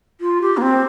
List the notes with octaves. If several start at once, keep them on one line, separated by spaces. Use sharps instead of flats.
F4
G4
A#3
C4